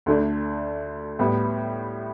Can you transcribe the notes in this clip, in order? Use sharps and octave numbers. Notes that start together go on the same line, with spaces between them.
D2 D3 A3 D4
A2 G3 B3